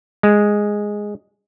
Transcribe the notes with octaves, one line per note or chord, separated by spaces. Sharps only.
G#3